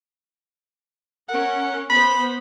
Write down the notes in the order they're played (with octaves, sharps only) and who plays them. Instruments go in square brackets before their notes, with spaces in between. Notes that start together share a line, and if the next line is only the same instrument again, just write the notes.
[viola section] C#4 A#4 [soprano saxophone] F#5
[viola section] B3 C5 [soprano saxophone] B5